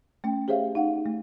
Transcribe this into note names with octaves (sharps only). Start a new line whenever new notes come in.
A3 C#4 G5
G4 G#4 C5 C#5 E5 F5
D#4 F5 F#5
A3